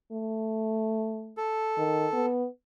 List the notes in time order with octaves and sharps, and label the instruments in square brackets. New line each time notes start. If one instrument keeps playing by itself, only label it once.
[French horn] A3
[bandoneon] A4
[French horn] D#3
B3